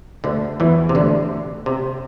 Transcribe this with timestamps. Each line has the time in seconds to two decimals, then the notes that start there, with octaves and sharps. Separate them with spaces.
0.24 D2 D3
0.60 E2 E3
0.89 C3
0.95 D2 D3
1.66 C3